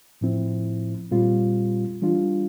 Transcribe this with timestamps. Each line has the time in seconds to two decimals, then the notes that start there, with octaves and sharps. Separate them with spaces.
0.21 A2 F3 C4 E4
1.11 A#2 G3 C4 F4
2.02 E3 G3 D4 F4